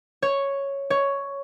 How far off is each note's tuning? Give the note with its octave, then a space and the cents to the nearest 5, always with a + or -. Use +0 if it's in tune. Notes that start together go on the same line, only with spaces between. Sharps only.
C#5 +0
C#5 +5